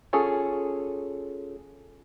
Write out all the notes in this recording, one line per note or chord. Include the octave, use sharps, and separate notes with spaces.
C#4 F4 G#4 A4 C#5 G#5